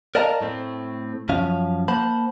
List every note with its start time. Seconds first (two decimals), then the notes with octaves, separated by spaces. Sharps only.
0.15 A#4 D5 D#5 F5 A5 A#5
0.41 A2 A3 C4
1.29 F#2 F3 C#4 F5
1.88 A#3 C5 F#5 A5 B5